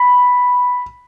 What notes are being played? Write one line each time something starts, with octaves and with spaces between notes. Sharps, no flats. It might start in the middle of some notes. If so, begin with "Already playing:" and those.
Already playing: B5